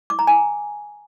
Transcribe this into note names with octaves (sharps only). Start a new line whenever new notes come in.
D6
A#5
G#5